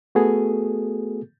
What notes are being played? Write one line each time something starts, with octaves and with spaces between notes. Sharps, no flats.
A3 B3 F#4 G#4 A4